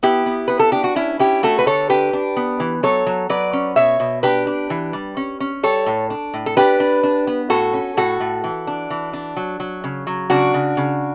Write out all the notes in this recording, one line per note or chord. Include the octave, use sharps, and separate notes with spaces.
B3 E4 G4
B3
B3 B4
A4
D4 G4
F#4
C#4 E4
C#4 E4 G4
A3 F#4 A4
B4
D3 A4 C#5
D4 G4 B4
D4
B3
E3
F#3 A4 C#5
F#3
F#3 B4 D5
C#4
B2 C#5 E5
B2
D4 G4 B4
D4
E3
G3
C#4
C#4
G3 A4 C#5
A2
D4
A2
A4
D4 G4 B4
D4
D4
B3
A2 F#4 A4
C#4
A2 F#4 A4
A2
E3
D4
E3
D4
F#3
F#3
C#3
F#3
C#3 D4 F#4
C#3
C#3